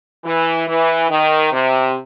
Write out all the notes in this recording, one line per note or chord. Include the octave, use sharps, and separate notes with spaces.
E3
E3
D#3
C3